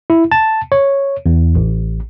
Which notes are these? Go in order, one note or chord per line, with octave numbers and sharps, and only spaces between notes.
E4
A5
C#5
E2
A1